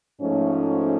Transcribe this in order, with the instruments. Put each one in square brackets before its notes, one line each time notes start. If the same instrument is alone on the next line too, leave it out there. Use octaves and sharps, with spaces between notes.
[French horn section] G#2 F3 A3 C#4